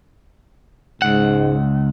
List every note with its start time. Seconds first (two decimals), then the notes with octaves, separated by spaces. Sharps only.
1.02 C#2 G#2 F#5